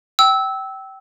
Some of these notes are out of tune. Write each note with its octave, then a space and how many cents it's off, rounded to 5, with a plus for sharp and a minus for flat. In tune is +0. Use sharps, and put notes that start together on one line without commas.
G5 -25 E6 -15